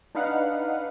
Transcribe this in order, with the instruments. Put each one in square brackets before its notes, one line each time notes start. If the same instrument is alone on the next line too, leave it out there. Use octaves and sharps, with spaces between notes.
[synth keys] D4 D#4 B4 F5 F#5